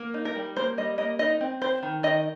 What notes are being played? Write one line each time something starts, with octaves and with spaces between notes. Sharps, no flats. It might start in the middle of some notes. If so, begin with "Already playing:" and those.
Already playing: A#3
D#4
A#4
G3
A#3 C5
G3 D#5
A#3 D#5
D#4 D#5
C4
C4 C5
D#3
D#3 D#5